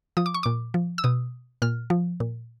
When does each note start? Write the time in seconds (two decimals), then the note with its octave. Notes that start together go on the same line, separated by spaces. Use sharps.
0.17 F3 D#6
0.26 D6
0.34 C#6
0.43 A#2 D6
0.74 F3
0.98 E6
1.04 B2 D#6
1.62 A#2 F6
1.90 F3
2.20 A#2